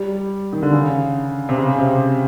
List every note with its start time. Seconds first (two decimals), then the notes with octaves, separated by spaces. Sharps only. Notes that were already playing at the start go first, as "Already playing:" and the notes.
Already playing: G3
0.52 D#3
0.63 D3
0.73 C#3
1.49 C3
1.58 C#3
1.79 C3